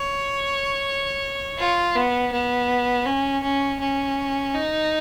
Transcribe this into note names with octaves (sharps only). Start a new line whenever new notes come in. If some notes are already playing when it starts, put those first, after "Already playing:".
Already playing: C#5
F4
B3
B3
C#4
C#4
C#4
D#4